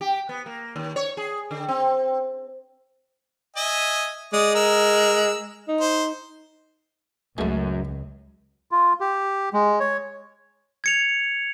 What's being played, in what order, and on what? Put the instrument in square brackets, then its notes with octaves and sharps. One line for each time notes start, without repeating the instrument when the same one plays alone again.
[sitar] G4
B3
A#3
D#2
C#5
G#4
D3
C4
[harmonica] D#5 E5 G#5
[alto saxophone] G#3 [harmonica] D5 D#6
[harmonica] A#4 E6
[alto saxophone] D#4
[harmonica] C5
[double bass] C#2 [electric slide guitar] F#2 [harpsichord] G#3 A3
[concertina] F4
G4
G#3
C#5
[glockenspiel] G#6 C#7 F7